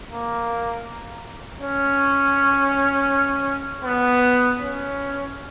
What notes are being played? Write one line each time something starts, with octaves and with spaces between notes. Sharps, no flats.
A#3
C#4
B3
C#4